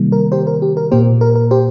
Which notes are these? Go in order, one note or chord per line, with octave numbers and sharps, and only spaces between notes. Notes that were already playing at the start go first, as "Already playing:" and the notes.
Already playing: C3 D#3 G3 A#3
A#4
G4 C5
A#4
G4
A#4
A#2 A#3 G4 C5
A#4
A#4
G4 C5